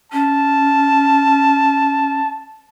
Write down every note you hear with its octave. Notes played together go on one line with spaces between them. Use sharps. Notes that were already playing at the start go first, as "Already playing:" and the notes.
C#4 A5